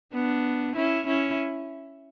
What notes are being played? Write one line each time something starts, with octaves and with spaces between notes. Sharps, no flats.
B3 D4
C#4 E4
C#4 E4